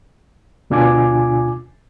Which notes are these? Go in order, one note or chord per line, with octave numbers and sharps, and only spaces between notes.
D2 B2 D4 F4 G#5 D6